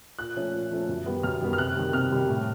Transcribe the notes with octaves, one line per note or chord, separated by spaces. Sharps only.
A#2 F#6
F3 A3 C#4
A#2
F3 A3 C#4
F#2
D#3 G3 B3
F#2 F6
D#3 G3 B3
F6
C3 F#6
D#3 G3
C3 F6
D#3 G3
A2